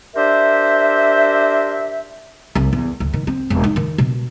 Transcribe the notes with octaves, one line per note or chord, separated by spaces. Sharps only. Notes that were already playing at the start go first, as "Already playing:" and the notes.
D4 G4 A#4 C5 E5
C2
E2
D2
D#3
C4
E1
D#4
D#3
B2